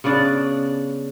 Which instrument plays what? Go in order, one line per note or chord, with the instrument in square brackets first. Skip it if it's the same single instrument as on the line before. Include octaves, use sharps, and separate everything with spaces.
[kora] C#3 B3 D4 D5